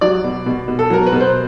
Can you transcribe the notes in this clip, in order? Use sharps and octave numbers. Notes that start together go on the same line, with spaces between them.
F#3 D5
B2
B2
B2
A4
F#3 A#4
B4
B2
C5